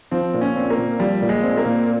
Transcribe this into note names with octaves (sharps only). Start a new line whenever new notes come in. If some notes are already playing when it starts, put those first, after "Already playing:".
F3 C4
A#2
C#4
C4
A#3
A#2
F3 G3
A#2
G#3
C4
A#3
A#2